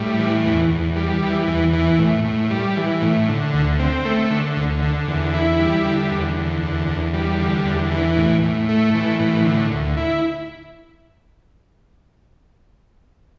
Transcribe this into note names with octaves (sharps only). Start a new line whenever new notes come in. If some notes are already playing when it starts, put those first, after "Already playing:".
Already playing: A2 G3
E3
E2
E2
G3
E3
E2
E3
A2
A2
G3
E3
A2
D3
D2
C4
A3
D3
D2
D3
E2
E4
G3
D3
E2
D3
E2
E2
G3
D3
E2
E3
A2
A2
A3
E3
A2
D3
D2
E4